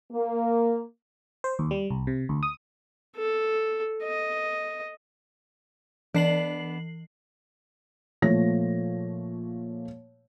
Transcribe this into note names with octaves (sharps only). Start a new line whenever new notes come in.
A#3
C5
D#2
G3
C2
C3
D2
D#6
A4
D#5
E3 B3 D4 C7 F#7
A#2 F3 A3 C#5 A#6